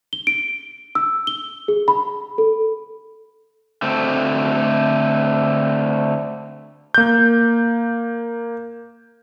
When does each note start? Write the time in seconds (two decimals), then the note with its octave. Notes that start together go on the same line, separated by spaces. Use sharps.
0.13 G7
0.27 D7
0.95 E6
1.27 G7
1.68 G#4
1.88 B5
2.38 A4
3.82 D3 A3 C4
6.94 A#3 G6